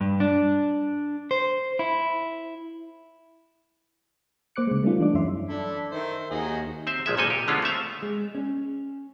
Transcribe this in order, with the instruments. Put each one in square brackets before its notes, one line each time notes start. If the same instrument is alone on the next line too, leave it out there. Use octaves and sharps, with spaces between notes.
[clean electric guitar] G2
D4
C5
E4
[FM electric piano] A#3 C5 D6 F#6 C#7
C#3 G#3
G3 A3 B3 C#4 D#4 F4
E3 D4 D6
F#2 C#4 E5 C6
[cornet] D4 [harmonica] E4 A4
[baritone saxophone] D#3 [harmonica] C5 [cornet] E5
[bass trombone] D#2 [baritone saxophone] D#3 [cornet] D#4 [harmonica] F#4 G#4 D#5
[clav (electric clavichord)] C4 C5 E5
A#1 F3 G#3 E5
G#1 A#2 F3 A4 D#5 G#5
G4
D3 G#3 B3 C#4 F4
A3 C4 E5 F5
[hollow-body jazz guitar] G#3
C#4